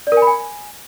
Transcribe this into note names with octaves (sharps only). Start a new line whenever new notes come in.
D5
A#4
G#5
B5
G#5